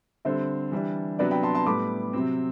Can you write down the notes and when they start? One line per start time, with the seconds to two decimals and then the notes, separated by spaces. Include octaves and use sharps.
0.25 D3 G3 C4 C5 E5
0.72 E3 G3 D4
1.19 C3 F#3 B3 D4 B4 D5
1.31 G5 B5
1.43 A5 C6
1.55 A5 C6
1.66 A2 G3 B3 B5 D6
2.13 C3 F#3 C4